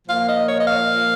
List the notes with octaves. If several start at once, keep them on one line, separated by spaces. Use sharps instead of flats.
A#2 F3 A#3 F5
D#5
C#5
D#5
F5